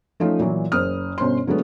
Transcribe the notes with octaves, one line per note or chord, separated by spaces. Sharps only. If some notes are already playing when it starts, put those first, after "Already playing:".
F3 A3 C#4 D#4 F4
A#2 E3 F#3
F#1 C5 D#6 F6
G1 B2 C#4 C5 C6
D3 F#3 G#3 A3 B3